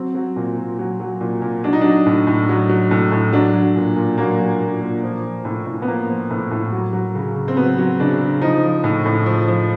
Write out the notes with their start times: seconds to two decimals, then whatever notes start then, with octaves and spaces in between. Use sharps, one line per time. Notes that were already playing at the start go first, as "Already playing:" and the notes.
Already playing: F#3 C4
0.15 F#3
0.36 A#2
0.57 A#2
0.79 F#3
1.00 F#3
1.21 A#2
1.42 A#2
1.64 F#3 D4
1.73 D#4
1.81 F#3 D4
2.06 A2
2.27 A2
2.49 F#3
2.69 F#3
2.91 A2
3.12 A2
3.33 F#3 D4
3.54 F#3
3.76 A#2
3.96 A#2
4.18 F#3 A#3
4.40 F#3
4.60 A#2
4.81 A#2
5.03 F3
5.24 F3
5.45 A2
5.66 A2
5.82 B3
5.88 F3 A#3
6.09 F3
6.30 A2
6.51 A2
6.72 F#3
6.93 F#3
7.15 C#3
7.36 C#3
7.48 C4
7.57 F#3 B3
7.78 F#3
8.00 C#3 D4
8.21 C#3
8.41 F3 D#4
8.63 F3
8.84 A2
9.06 A2
9.26 F3
9.48 F3